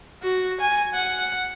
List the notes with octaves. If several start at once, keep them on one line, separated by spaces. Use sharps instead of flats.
F#4
G#5
F#5